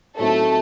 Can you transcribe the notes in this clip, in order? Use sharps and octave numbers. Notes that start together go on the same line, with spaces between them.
A2 F#3 A3 C4 D#4 A4